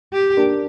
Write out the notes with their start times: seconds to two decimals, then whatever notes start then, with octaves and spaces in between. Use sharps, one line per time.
0.13 G4
0.37 A#3 D4